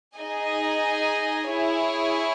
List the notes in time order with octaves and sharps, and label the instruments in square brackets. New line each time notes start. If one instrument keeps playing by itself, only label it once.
[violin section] D#4 G#4 D#5 G#5
E4 G#4 C#5